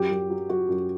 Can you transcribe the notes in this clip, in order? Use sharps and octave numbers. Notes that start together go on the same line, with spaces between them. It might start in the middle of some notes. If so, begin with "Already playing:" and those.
Already playing: F#2 G4
F#2
F#3
F#3 F#4
F#2